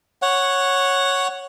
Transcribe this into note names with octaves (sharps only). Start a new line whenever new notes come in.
C#5 F#5